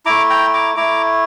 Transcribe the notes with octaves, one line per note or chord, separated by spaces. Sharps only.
A3 E4 A#5 D6
G5 A#5
A#5 D6
A3 E4 A#5 D6